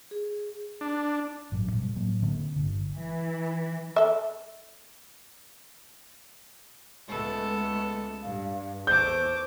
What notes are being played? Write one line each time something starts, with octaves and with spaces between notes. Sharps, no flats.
G#4
D4
A1 G#2 F#3
B2 G3
A2 F#3 A#3
D3 A#3 C4
G1 E2 D3
E3
A4 E5
C#2 G#3 A3 B3 A4
G2 F5
E2 A3 C5 D6 G6